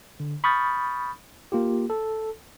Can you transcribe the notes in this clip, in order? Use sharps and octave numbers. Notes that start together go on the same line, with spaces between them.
D3
B5 C#6 D#6 F6 G6 A6
A#3 F4 G4
A4